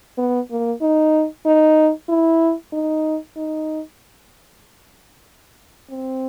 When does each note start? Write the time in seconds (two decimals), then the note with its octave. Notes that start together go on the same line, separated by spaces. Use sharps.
0.18 B3
0.51 A#3
0.81 D#4
1.46 D#4
2.09 E4
2.73 D#4
3.36 D#4
5.91 C4